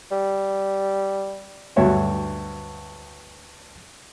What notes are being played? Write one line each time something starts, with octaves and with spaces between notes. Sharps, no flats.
G3
D2 G2 F#3 F#4 C#5 E5